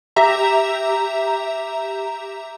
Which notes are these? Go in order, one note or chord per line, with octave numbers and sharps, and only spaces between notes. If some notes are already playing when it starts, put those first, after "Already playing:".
G4 E5 A#5